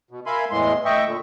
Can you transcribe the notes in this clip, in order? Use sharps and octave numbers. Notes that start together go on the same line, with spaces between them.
B2
A#4 E5 F5 G#5 B5 C6
E2 A2 E3 G#3 C6
A2 D#5 E5 G5 C#6
A#2 D3